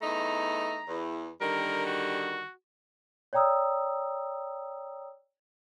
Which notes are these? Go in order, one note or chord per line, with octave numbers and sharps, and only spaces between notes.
E2 A3 D#4 A#5
E2
D3 D#3 G3 A#4
F#4
C#5 D5 G5 A#5 D#6 E6